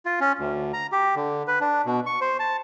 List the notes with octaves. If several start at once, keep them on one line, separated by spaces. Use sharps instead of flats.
F4
C#4
D2
A#5
G4
D3
B4
D4
B2
C#6
C5
A5